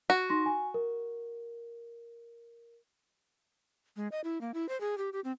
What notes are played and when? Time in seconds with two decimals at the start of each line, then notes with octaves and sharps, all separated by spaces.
0.10 F#4
0.29 D#4 C6 A#6
0.46 G#5
0.74 A#4
3.97 G#3
4.12 D#5
4.24 E4
4.41 A#3
4.54 E4
4.69 C5
4.81 G#4
4.98 G4
5.13 G4
5.24 C4